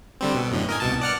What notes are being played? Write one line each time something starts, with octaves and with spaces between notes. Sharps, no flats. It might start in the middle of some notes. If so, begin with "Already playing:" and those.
D3 G3 C4
B2
F#2 A2 D3
A#4 D#5 G#5
C2 B2 A5
D5 F#5 F6